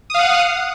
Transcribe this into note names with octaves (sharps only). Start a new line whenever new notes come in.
F5 F#5 D#6